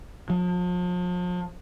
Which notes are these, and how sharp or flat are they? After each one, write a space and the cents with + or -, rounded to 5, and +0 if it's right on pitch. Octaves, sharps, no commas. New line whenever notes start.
F3 +40